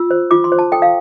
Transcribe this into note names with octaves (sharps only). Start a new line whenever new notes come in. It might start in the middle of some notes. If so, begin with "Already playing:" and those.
Already playing: F4 E6
C5
F4 D6
C6
C5
A5
A4 G5
F5